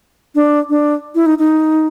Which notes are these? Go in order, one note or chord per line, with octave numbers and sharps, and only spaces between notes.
D4
D4
E4
D#4
D#4